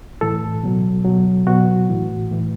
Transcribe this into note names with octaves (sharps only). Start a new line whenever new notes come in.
A2 E3 A4
B2 F#3
B2 F#3
B2 F#3 F#4
A2 E3
A2 E3